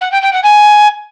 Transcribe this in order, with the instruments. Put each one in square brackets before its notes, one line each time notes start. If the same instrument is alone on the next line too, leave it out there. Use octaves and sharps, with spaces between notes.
[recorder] F#5
G5
G5
F#5
G#5